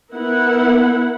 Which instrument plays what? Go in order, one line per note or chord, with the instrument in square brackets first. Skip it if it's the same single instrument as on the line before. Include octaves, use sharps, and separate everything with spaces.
[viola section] B3 E4 A#4 F#5